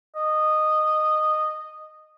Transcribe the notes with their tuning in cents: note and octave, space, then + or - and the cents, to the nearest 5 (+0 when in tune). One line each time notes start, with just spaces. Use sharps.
D#5 -10